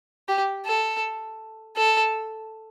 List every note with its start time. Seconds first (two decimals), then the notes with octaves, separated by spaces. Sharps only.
0.28 G4
0.66 A4
1.76 A4